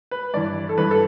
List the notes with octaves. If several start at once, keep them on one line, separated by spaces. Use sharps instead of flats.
B4
G2 E3 D5
A4
G2 E3 B4
A4